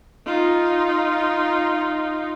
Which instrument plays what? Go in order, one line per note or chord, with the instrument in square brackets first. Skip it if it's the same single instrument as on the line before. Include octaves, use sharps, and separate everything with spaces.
[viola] D#4 F4